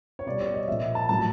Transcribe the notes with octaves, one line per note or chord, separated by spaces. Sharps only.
C#5
B2 G3 D5
C#5
D#5
A#2 F3 E5
A5
A2 F#3 A5